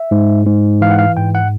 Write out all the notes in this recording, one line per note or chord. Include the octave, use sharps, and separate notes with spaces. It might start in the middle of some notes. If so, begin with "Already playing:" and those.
Already playing: E5
G#2
G#2
E3 F5
F#5
F5
G#2 G5
F#5